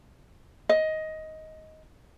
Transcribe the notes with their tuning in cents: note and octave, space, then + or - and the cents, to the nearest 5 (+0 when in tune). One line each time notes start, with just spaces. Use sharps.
D#5 +15